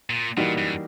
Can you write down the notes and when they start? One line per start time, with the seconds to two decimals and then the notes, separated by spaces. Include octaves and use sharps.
0.10 A#2
0.37 A#2 E3 G3 A#3 D#4 F#4
0.58 F#2